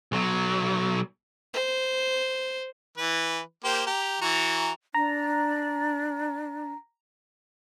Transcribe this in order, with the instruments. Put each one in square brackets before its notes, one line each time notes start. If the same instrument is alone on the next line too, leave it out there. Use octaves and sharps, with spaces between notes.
[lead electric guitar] B1 F#3
[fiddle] C5
[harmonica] E3 B4
A#3 G4 C5
G4 A#5
E3 F#4 A#5
[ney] D4 [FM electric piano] A#5